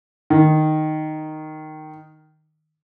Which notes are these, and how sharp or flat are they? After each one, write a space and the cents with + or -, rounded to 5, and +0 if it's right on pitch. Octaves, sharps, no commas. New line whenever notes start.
D#3 -5